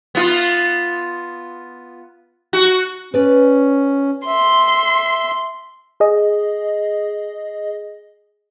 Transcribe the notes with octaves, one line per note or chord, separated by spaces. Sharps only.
B3 F4
F#4
C#4 B4 D5
E5 C6
G#4 D#5